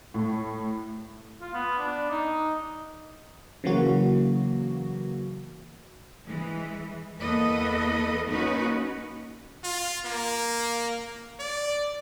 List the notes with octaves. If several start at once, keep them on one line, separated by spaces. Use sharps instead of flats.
A2
F4
B3
D4
D#4
C#3 E3 F#3 A#3 F#4
E3 G#3
E2 A#3 A4 B4 D#5
A#3 C#4 D#4 F#4 B4
F4
A#3
D5